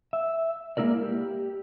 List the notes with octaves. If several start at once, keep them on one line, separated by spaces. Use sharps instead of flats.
E5
G#3 A#3 E4 A#4 D5
G4